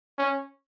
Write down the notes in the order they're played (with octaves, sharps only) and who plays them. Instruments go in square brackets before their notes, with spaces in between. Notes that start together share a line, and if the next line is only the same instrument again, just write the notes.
[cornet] C#4